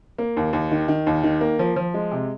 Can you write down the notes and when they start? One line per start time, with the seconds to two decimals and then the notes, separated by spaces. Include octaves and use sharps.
0.18 A#3
0.37 D#2
0.53 D#2
0.71 D#3
0.88 D#3
1.07 D#2
1.23 D#3
1.41 A#3
1.59 F3
1.76 F3
1.94 G#3
2.11 C3